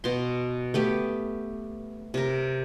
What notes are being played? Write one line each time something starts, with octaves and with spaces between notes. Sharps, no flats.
B2 C6
A3 B3 G4
C3 A#4